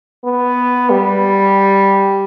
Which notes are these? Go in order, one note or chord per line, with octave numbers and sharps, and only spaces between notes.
B3
G3